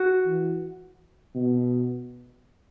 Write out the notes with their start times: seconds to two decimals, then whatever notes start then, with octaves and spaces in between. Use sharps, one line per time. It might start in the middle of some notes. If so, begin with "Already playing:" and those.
Already playing: F#4
0.26 E3
1.35 B2